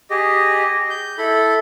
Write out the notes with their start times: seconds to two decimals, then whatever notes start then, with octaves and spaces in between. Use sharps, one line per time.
0.10 G4 G#4 D#5
0.90 G6
1.18 E4 A4 B5